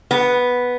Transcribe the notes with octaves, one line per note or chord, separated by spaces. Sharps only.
B3